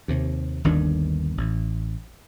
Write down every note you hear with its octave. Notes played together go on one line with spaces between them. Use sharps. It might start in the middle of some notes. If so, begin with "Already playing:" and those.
D#2 C3
G1 D#2 D#3 D4
A1